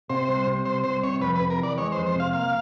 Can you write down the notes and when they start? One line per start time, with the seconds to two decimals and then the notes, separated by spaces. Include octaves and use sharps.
0.10 C3 C5
0.29 C2
0.47 C3
0.65 C2 C5
0.84 C2 C5
1.03 C3 C#5
1.21 F2 B4
1.35 B4
1.40 C3
1.50 A#4
1.59 E3 D5
1.78 G#3 C#5
1.92 F2 C5
2.06 C5
2.15 C3 F5
2.33 A#3 F5